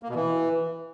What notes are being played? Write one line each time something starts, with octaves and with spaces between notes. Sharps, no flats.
A#3
B2
E3